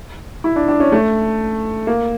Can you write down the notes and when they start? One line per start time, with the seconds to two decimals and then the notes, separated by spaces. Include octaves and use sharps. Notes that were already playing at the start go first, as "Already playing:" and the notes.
0.44 E4
0.56 D4
0.68 D4
0.80 C#4
0.92 A3
1.87 A#3